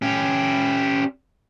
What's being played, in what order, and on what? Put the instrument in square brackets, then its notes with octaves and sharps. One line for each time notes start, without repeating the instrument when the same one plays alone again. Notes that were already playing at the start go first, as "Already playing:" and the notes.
[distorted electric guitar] C#4 G4